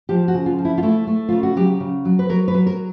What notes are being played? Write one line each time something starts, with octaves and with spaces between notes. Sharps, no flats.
F3 G4
F#4
C#3
F4
F3
E4
F4
A3 E4
A3
C#3 F4
F#4
F#3 G4
C#3
F#3
B4
F#3 A#4
B4
F#3
A#4